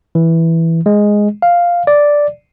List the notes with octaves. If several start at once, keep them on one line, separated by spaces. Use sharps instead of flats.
E3
G#3
F5
D5